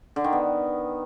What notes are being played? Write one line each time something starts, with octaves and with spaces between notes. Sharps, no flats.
D3
D#3
B3